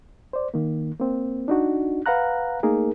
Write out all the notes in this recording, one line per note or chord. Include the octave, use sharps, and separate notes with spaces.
C5 D5
D#3 A#3
A#3 C4
D4 D#4 F#4
B4 F5 F#5 A#5 F#6
A3 A#3 D#4 G#4 A#4